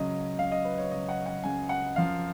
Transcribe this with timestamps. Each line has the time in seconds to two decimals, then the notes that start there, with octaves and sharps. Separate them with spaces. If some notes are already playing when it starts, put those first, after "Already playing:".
Already playing: C#2 C#3 F#3 D#5
0.38 C#2 C#3 F#3 F5
0.52 D#5
0.65 B4
0.78 C#5
0.91 C#2 C#3 F#3 D#5
1.09 F#5
1.26 F#5
1.44 C#2 C#3 F#3 G#5
1.69 F#5
1.96 F#2 F3 F5